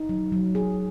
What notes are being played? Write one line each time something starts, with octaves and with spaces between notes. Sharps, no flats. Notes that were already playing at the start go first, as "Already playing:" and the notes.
Already playing: D#4
F#3
F#3
G#4